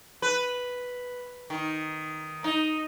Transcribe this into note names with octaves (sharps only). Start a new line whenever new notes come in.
B4
D#3
D#4